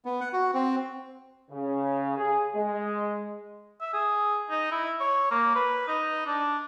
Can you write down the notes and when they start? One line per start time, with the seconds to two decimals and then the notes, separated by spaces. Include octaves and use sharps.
0.05 B3
0.20 F#5
0.33 F#4
0.54 C4
1.51 C#3
2.17 G#4
2.55 G#3
3.81 E5
3.93 G#4
4.50 D#4
4.71 E4
5.00 C#5
5.31 A#3
5.56 B4
5.88 D#4
6.26 D4